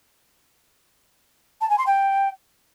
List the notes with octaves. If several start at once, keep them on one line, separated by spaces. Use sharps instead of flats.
A5
G#5
C6
G5